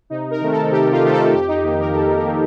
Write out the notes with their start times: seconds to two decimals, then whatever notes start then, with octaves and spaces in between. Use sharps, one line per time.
0.10 C3 D#4
0.31 A#4
0.41 D#3 A3 C4
0.51 A4
0.71 C3 G4
0.92 F4
1.03 D#3 A3 C4 G4
1.13 A4
1.33 F2 G4
1.48 D#4
1.64 D#3 A#3 D#4
1.79 A#4
1.95 F2 A4
2.15 A#4
2.25 D#3 A#3